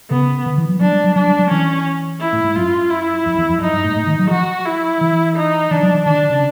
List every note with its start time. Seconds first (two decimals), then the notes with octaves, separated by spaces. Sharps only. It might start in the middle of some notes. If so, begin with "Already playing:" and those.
0.10 C#3 B3
0.46 D3
0.58 E3
0.69 F#3
0.80 F#3 D4
0.92 G3
1.04 F#3
1.15 F#3 D4
1.27 G3
1.39 F#3
1.51 E3 C#4
2.21 E4
2.33 A2
2.44 G#2
2.56 F#2 F4
2.90 E4
3.26 F2
3.38 E2
3.49 F2
3.61 F#2 D#4
3.73 G2
3.84 A2
3.96 A2
4.07 D#3
4.19 F#3
4.31 F3 F#4
4.65 E4
5.01 E3
5.37 D#4
5.71 E3 D4
5.83 F#3
5.94 E3
6.06 D#3 D4
6.18 D3
6.30 C#3